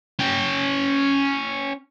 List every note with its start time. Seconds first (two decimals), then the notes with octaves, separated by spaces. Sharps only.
0.19 C#4 G5